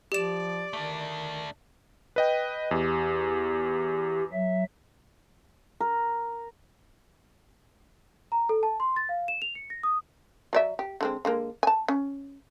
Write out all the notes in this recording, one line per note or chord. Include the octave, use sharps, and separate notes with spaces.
F3 G4 D5 E7
D#3 A3 D4
B4 D#5 G5
E2 G4
F#3 E5
A#4
A#5
A4
A5
C6
A6
F5
E7
F7
C#7
A#6
D#6
F#3 D5 E5
G4
D3 G#3 C4
D3 G#3 A#3
G#5 A5
C#4